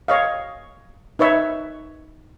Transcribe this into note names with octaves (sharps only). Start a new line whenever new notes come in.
C#5 D#5 F5
D#4 B4 C#5 E5